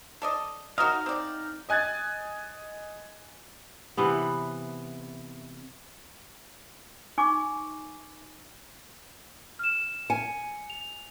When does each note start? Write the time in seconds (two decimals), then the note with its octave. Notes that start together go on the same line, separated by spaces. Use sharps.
0.22 A4 D5 D#5
0.78 D#4 F#4 A#4 D#5 F5
1.06 C4 D5
1.69 D#5 G#5 F#6 G#6 A6
3.97 C3 E3 B3
7.18 D#4 G#5 C#6 D6
9.59 F6 E7
10.10 G#5 C#7
10.70 F7